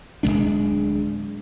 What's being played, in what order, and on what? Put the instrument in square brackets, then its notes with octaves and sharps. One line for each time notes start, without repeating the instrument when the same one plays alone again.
[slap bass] D1 F#2 G#3 D4